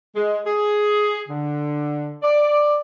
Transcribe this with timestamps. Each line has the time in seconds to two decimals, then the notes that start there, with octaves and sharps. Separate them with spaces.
0.15 G#3
0.46 G#4
1.28 D3
2.23 D5